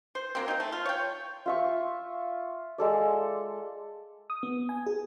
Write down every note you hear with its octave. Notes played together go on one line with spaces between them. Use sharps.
C5
F#3 A#3 C4
C4 D#4
A3
F4
C#5 G5
F4 E5 C#6
G#3 A4 D5
D#6
B3
G#5
G#4